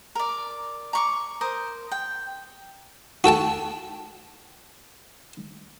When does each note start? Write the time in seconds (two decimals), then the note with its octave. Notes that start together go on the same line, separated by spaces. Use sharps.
0.15 A#4 D5
0.93 A#5 C#6 D6
1.41 A#4 C5 D#6
1.91 G5
3.24 F#4 A4 G5 A5